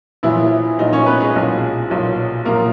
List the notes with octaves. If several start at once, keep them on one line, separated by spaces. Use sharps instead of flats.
A#1 A#2 E3 F#3 E4
A#1 A#2 F#3 D#4
C#4 C#5
B3 B4
G#3 G#4
B1 A#2 F#3
B1 A#2 F#3
A#1 A#2 F#3 A#3 A#4